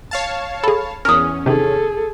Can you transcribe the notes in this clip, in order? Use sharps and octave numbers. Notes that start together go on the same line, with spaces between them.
C#5 F5 A5
G#4 A4 B5
E2 C#4 A#4 D#6 F6
C3 D#3 G#4 A4